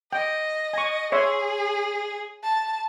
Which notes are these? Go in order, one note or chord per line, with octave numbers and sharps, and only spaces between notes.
D#5 G5
G#5 C#6
G#4 C#5 E5 C6
A5